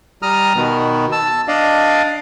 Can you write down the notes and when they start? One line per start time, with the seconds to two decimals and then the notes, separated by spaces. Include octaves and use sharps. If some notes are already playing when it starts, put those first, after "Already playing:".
0.23 G3 A#5 D#6 F6
0.56 B2 D#3 B3
1.12 A5 E6
1.48 D4 D5 D#5 F5